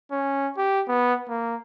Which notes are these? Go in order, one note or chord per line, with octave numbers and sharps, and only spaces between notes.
C#4
G4
B3
A#3